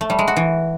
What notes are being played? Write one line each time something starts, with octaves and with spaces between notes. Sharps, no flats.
A3
G3
G#3
F#4
E3